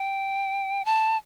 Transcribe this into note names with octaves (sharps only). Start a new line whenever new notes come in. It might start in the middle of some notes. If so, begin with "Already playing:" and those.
Already playing: G5
A5